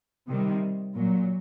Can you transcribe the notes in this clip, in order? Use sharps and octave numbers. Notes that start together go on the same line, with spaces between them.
C3 D#3 G3
A#2 F#3